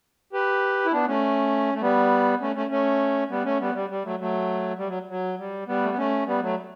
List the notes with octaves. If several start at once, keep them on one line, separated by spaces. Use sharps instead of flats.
G4 B4
E4
B3 D4
A3 C#4
A3
G3 B3
A3 C#4
A3 C#4
A3 C#4
G3 B3
A3 C#4
G3 B3
G3
G3
F#3 A3
F#3 A3
G3
F#3
F#3
G3
G3 B3
A3
B3
A3 C#4
G3 B3
F#3 A3